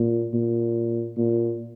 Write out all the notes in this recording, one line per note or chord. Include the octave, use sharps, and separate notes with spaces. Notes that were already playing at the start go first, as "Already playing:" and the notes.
Already playing: A#2
A#2
A#2